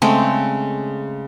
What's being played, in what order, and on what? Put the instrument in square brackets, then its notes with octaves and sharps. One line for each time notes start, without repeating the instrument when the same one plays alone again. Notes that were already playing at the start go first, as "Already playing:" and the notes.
[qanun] C#3 G#3 A3 C4